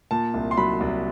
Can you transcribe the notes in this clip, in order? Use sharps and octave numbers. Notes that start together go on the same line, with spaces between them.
A#2 A5
C2
C6
F#3 B5
C2